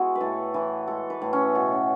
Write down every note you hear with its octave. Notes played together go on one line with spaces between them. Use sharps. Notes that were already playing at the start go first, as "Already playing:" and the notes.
Already playing: G#3 B3 E4 F#4 G#4
B4
A2 A4
E3
G#3 A4
B4
A2
C#4
B2 B3
C#4